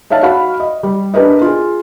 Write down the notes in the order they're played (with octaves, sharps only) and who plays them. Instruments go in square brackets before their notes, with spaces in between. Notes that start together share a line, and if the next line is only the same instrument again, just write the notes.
[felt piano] D#4 C#5 E5 F5 A5
F#4 F5 B5
D#5
G3
D4 G4 A#4 B4 D#5
F4 G#4